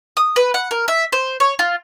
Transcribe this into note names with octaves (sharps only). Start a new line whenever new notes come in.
D#6
B4
F#5
A#4
E5
C5
C#5
F4